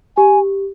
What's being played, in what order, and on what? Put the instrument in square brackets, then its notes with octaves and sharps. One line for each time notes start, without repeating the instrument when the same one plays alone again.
[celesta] G4 [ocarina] G#5